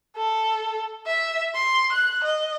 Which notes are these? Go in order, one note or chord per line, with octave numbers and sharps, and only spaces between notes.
A4
E5
C6
F#6
D#5